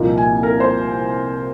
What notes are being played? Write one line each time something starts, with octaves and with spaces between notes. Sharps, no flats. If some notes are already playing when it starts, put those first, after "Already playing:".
Already playing: C2 A#2 F3 A#3 D#4
G#5
A#4
C5